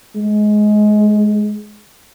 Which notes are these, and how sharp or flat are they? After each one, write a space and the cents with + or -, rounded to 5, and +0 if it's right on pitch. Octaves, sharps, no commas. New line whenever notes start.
G#3 +20